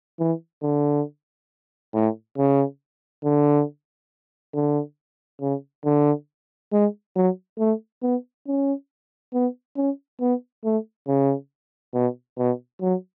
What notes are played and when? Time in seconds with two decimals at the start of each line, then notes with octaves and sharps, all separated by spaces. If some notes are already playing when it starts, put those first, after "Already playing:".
0.19 E3
0.63 D3
1.95 A2
2.38 C#3
3.24 D3
4.54 D3
5.41 C#3
5.85 D3
6.73 G#3
7.16 F#3
7.59 A3
8.02 B3
8.47 C#4
9.33 B3
9.77 C#4
10.21 B3
10.64 A3
11.08 C#3
11.94 B2
12.38 B2
12.81 F#3